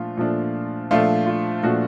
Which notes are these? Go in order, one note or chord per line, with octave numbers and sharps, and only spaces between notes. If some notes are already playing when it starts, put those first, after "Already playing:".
Already playing: A#2 F3 A3 D4 F4
A#2 F3 A3 D4
A#2 F3 A3 D4 F4
F4
A#2 F3 A3 D4 F#4